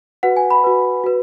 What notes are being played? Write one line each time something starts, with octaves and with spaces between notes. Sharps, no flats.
F#4 B4 F#5
G#5
B5
F#4 B4
F#4 B4